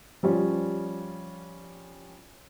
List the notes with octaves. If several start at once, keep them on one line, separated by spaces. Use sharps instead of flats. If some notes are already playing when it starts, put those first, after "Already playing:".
F3 G3 C#4